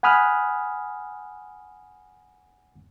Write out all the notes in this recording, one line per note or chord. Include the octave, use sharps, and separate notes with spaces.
F#5 G#5 B5 D#6 F6 F#6